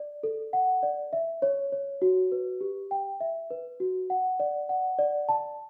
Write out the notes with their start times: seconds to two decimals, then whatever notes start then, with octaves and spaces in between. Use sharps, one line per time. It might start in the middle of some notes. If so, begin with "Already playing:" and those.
Already playing: D5
0.23 A4
0.53 F#5
0.83 D5
1.13 E5
1.42 C#5
1.72 C#5
2.02 F#4
2.32 B4
2.61 G4
2.91 G5
3.21 E5
3.51 B4
3.80 F#4
4.10 F#5
4.40 D5
4.69 F#5
4.99 D5
5.29 A5